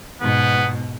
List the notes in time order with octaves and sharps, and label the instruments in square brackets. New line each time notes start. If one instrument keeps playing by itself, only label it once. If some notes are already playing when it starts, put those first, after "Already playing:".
[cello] G#2 B2 [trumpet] B3